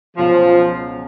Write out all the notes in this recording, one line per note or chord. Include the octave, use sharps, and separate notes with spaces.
C#2 B2 F3 F#3